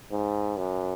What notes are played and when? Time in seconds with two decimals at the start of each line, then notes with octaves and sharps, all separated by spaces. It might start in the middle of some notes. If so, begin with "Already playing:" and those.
0.11 G#2
0.57 F#2